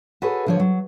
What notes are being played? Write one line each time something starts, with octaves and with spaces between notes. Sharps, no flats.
F#4 G#4 A4 B4 C#5
D3 F3 C#5
F#3